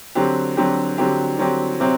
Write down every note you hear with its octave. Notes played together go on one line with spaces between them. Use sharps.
D3 F#3 C4 G4
D3 F#3 C4 G4
D3 F#3 C4 G4
D3 F#3 C4 G4
C3 F#3 C4